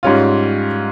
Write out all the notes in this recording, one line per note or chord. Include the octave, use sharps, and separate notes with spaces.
G#2 G3 C#4 F4